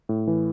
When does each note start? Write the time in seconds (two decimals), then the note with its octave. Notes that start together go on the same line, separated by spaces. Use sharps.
0.09 A2
0.27 E3